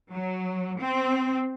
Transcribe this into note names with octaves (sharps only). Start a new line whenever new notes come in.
F#3
C4